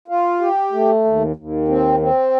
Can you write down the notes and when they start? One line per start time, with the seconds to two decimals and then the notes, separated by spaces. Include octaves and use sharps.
0.08 F4
0.40 G4
0.72 A3
1.04 D#2
1.36 D#2
1.68 C4
2.00 C4